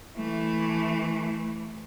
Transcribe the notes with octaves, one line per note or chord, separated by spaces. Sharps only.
E3 A3